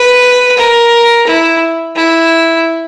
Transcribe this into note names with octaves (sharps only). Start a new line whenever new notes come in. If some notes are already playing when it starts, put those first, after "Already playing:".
Already playing: B4
A#4
E4
E4